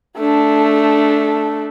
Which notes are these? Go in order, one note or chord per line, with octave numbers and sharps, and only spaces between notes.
A3 D4